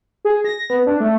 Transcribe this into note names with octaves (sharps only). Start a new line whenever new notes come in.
G#4
A#6
B3
D4
A3